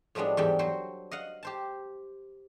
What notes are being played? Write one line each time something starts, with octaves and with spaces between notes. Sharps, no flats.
A2 F3 G3 G#3 B3 D4
E2 G#2 G3 A4 G5 B5
F#3 C5 G5
D#5 F5 F#5
G4 C5 A5